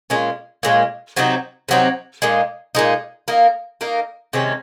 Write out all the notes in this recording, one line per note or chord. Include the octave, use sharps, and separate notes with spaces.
A#2 G#3 C#4
A#2 G#3 C#4
C3 F#3 C4 D#4
C3 F#3 C4 D#4
A#2 G#3 D#4
A#2 G#3 D#4
A#3 D#4 A#4
A#3 D#4 A#4
C3 D#3 G#3 C#4